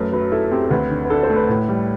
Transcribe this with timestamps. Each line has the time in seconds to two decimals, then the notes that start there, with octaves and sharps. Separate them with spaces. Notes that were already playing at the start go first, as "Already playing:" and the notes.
Already playing: F#2 A3 B4
0.13 F#3 B4
0.32 E4 A4
0.51 C4 G4
0.64 A4
0.70 D2 B4
0.91 D3
1.04 B4
1.10 D4 A4
1.23 C5
1.30 A3
1.36 B4
1.49 A2 B4
1.68 G3